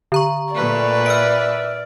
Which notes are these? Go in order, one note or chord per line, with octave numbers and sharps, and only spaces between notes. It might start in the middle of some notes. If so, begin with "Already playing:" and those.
D3 A#5 C#6
A#2 A3 B4 D5
E5 F6 D7